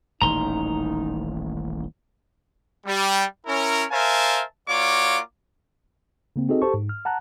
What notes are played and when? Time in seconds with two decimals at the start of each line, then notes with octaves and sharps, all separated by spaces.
0.22 D#1 A1 D#3 D#4 A#5 C6
2.86 G3
3.47 C#4 E4 A#4
3.91 A#4 C5 E5 F5 G#5 A5
4.68 A#3 F4 F#4 C#5 D5 D6
6.36 C#3 A#3 C4
6.49 C4 D#4 F#4 G#4 A4 D#5
6.62 G4 A4 C5 A5 C#6
6.74 G#2
6.89 F6
7.05 F#5 A5 A#5 F#6